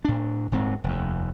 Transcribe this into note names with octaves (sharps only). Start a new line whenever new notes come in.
A2 D4
D#1 G#2 C4
F1 D#2